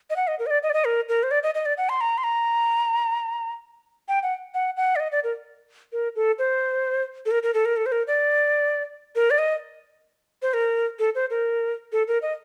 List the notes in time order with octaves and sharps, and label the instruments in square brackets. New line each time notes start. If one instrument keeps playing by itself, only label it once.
[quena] D#5
F#5
D#5
A#4
D#5
D5
D#5
D5
D#5
A#4
A#4
C5
D5
D#5
D#5
D5
F#5
C6
A#5
C6
A#5
G5
F#5
F#5
F#5
D5
D#5
D5
A#4
A#4
A4
C5
A4
A#4
A#4
A4
A#4
A4
C5
A#4
D5
A#4
D5
D#5
C5
A#4
A4
C5
A#4
A4
A#4
D#5